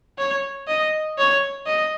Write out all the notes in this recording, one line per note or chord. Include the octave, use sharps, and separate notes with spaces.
C#5
D#5
C#5
D#5